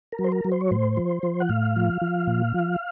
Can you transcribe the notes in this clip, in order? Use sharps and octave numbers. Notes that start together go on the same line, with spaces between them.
A#4
F#3
C5
A#4
F#3
C5
C#5
A2 C5
F3
F3
F#5
A2 F5
F3
F3
A#2
F3